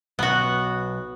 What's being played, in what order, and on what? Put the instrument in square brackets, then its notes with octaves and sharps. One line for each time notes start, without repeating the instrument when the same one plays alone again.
[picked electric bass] B1 [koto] B3 F#4